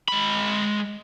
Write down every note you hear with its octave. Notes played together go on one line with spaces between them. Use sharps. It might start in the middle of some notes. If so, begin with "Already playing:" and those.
G#3 B5